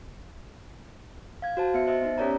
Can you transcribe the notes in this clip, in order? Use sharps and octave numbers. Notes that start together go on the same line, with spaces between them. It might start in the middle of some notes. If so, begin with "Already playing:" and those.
F5 G#6
F#4 C5 A5
B3 E5 C#7
C5 D#5 E5
B3 D#4
C#4 G4 A#4 C#5 D5 A#5